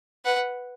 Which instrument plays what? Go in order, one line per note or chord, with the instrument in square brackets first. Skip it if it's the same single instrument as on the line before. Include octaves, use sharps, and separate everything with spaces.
[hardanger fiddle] B4 [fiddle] F#5